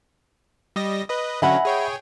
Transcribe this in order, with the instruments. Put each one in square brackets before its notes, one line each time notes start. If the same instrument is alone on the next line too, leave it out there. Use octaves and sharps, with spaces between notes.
[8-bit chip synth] G3 D#5 A#6
B4 D#5
[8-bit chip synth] D3 F#3 C#4 [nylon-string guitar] D#5 F#5 [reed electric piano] E5 G#5 B5
[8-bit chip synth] G#4 C#5 G5